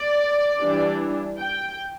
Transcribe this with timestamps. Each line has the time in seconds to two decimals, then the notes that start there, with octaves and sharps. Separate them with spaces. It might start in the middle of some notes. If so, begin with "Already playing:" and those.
Already playing: D5
0.59 E3 G3 D4
1.38 G5